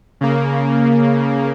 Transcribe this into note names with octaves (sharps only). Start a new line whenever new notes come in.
C#3 A#3